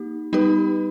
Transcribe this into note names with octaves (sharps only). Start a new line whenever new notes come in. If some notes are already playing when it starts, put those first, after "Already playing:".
Already playing: A#3 D#4 G4
G3 B3 D#4 G4 B4